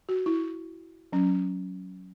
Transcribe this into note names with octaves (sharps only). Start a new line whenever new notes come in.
F#4
E4
F#3 C#4